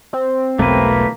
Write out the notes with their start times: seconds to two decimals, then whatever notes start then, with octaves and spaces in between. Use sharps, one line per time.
0.13 C4
0.59 E1 B1 A3 A#3 B4